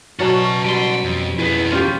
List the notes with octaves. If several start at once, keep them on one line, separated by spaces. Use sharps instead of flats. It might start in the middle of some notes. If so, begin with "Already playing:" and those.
B2 F#3 C#4 F#4 D5 A5
G3 F#5 A5 C6
F2
F2 B3 E4 G#4 B4
C#4 F4 G4 G#4 C#5